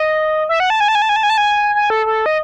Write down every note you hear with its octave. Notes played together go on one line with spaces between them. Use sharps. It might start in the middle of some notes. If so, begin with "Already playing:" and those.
Already playing: D#5
E5
F#5
A5
G#5
A5
G#5
A5
G#5
A5
G#5
A5
G#5
G#5
A4
A4
D#5